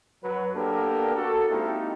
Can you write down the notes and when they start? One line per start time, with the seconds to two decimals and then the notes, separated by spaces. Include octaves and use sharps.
0.24 F#2 F#3 B4
0.54 A#3 B3 D4 G4 A4 A#4
1.15 F#4 A4
1.50 G#3 A#3 C4 D#4 E4 G4